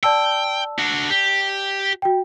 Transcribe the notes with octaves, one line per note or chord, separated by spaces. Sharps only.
D5 G5 A5 E6
D4 F#4
G4
F#4 G5